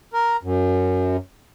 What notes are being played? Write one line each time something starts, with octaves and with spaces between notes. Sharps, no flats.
A#4
F#2